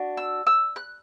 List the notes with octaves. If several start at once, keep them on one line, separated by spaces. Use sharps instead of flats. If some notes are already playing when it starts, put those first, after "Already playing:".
Already playing: D4 F#4
E6
E6
F#6